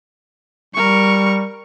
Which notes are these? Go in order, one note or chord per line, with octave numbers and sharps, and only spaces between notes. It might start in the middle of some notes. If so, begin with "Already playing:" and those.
G3 A#4 C#6